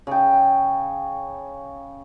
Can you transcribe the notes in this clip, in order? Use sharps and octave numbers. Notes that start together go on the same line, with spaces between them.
C#3 G5